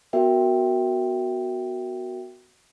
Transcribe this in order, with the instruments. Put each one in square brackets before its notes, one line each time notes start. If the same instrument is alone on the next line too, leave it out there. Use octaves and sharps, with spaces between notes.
[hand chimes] B3 F#4 A#4 E5 G5